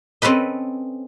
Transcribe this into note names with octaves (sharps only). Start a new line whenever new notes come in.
C4 C#4 A4 B4 D#5